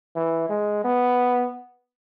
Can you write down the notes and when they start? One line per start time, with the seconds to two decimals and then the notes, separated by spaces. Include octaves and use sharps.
0.16 E3
0.50 G#3
0.85 B3